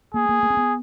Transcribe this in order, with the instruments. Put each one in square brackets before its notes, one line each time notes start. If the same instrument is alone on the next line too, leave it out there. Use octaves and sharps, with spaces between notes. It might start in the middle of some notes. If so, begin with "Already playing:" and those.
[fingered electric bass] A#3 [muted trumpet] G#4
[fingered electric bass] A#3
A#3
C4
B3